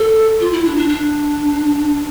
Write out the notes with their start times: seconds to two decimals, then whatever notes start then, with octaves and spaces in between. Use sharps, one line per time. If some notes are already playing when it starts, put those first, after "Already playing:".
Already playing: A4
0.40 F4
0.53 E4
0.65 D4
0.76 D4
0.89 D4